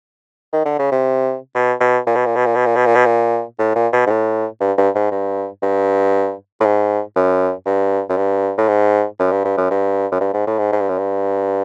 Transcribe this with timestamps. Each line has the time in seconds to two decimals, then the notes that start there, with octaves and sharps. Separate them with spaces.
0.53 D#3
0.65 D3
0.79 C#3
0.92 C3
1.55 B2
1.80 B2
2.06 A#2
2.15 B2
2.26 A#2
2.36 B2
2.46 A#2
2.55 B2
2.66 A#2
2.76 B2
2.86 A#2
2.95 B2
3.05 A#2
3.59 A2
3.76 A#2
3.93 B2
4.06 G#2
4.10 A2
4.61 G2
4.77 G2
4.95 G#2
5.11 G2
5.62 G2
6.60 A2
6.65 G#2
7.16 F#2
7.66 G2
8.09 F#2
8.17 G2
8.58 A2
8.68 G#2
9.19 F#2
9.32 G2
9.45 G2
9.57 F#2
9.71 G2
10.11 F#2
10.21 G2
10.34 G#2
10.47 A2
10.59 G#2
10.72 G#2
10.80 G2
10.89 F#2
10.98 G2